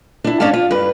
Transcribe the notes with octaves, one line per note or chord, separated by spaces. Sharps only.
D4 E4
G#2 C#4 D4 C#5 F5 A5
F4
G2 B4